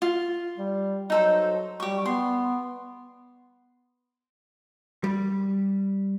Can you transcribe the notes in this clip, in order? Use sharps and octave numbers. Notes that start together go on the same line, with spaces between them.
F4
G3
F#3 D#4 A4 C5
G3 G4 C#6
B3 C6
G3